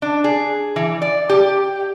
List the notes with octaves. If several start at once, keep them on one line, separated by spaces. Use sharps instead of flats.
D4
G#4
E3
D5
G4